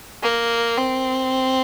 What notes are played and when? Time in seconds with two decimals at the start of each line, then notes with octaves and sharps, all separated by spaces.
0.23 A#3
0.78 C4